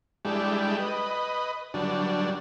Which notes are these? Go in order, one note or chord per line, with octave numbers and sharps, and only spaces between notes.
G3 G#3 D4 E4 G4 A4
B4 D#5
D3 F#3 G3 D4